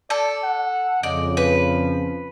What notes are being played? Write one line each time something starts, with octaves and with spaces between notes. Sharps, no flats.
A4 D5
F#5
F2 C#3 D5 D#5
F3 B4